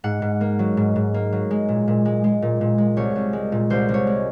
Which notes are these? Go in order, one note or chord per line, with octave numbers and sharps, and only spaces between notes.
G#2 F#5
G#2
A#3
F#3
G#2
G#2
A#3
F#3
G#3
A#2
A#2
G#3
G#3
A#2
A#2
G#3
C2 C#5
C2
G#3
A#2
C2 C5
C2
C#5
G#3